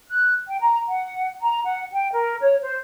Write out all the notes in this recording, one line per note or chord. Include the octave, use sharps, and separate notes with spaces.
F#6
G5
A#5
F#5
A#5
F#5
G5
A#4
C#5
C5